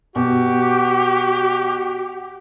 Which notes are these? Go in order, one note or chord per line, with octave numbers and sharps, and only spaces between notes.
B2 F#4 G4